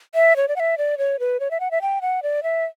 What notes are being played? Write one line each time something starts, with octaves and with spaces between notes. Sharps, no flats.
E5
C#5
D5
F#5
E5
D5
C#5
B4
C#5
E5
F#5
E5
G5
F#5
D5
E5